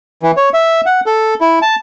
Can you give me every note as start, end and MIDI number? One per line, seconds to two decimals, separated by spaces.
0.23 0.31 52
0.37 0.49 73
0.54 0.81 76
0.86 1.00 78
1.06 1.34 69
1.41 1.59 64
1.62 1.75 81